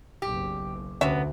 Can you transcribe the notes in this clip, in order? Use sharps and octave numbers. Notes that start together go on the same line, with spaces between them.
F#1 B1 G4
D2 C3 B3 C#4 E5